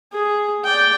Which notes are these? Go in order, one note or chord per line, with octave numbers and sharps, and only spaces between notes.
G#4
D5 G5